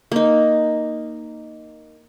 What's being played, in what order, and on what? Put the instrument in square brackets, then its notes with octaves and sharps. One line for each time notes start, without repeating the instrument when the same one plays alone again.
[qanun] A#3 D#4